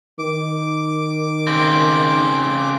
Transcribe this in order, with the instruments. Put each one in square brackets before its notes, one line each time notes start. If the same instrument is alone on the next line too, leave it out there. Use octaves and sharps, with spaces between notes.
[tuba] D#3 [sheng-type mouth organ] D6
[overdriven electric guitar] C#3 C4